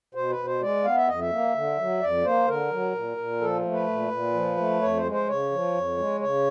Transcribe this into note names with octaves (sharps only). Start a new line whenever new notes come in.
B2 C5
B4
B2
C5
G#3 D5
B3 F5
E5
F2 D#5
E5
A#3
D3
F#3
F2 D5
A#3 C5
D3 A#4
F#3
A#2
A#2
F3 A4
A3
B4
A#2
A#2
F3
A3
F2 C#5
C5
G#3
C5
C#3 C#5
F3
F2
G#3
C#3 C#5